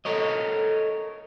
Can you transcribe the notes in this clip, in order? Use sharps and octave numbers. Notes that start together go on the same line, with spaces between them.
A4 A#4 C#5 D#5